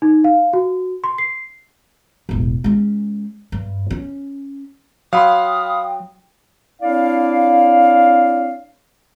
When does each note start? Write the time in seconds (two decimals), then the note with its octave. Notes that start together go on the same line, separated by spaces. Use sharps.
0.02 D#4
0.24 F5
0.53 F#4
1.04 C6
1.18 C7
2.29 E1 A1
2.64 G#3 C#4
3.52 G2
3.91 C#4
5.13 F#3 F5 G5 B5 C6 D#6
6.81 C4 D4 E4 C#5 D5 F5